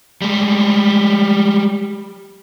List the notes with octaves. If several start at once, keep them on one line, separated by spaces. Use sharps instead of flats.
G3 G#3